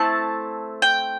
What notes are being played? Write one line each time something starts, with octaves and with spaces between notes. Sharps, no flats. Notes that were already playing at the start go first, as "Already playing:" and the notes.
Already playing: A3 C4 E4 A5
G5